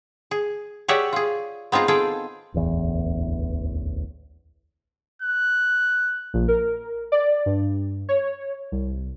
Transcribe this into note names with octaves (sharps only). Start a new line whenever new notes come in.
G#4
G4 G#4 C#5 D5 E5 F#5
F4 G#4
B3 C4 D#4 F4 G#4
F4 G#4 A4 G5
D1 A1 E2
F#6
A#1
A#4
D5
G2
C#5
C2